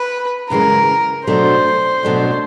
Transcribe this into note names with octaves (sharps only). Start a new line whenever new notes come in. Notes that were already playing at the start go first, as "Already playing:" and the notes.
Already playing: B4
F#2 C#3 E3 G#3 A#4
B2 F#3 A3 D4 C5
B2 F#3 A3 D4